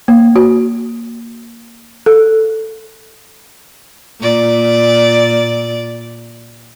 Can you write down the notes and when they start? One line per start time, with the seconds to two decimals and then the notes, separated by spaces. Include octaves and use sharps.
0.08 A#3
0.36 F#4
2.06 A4
4.20 A#2 D5